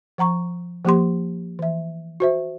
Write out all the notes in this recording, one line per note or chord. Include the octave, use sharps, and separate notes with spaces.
F3 F#5 A#5 C#6
F3 A#3 G4 C6
E3 E5
F#4 C5 E5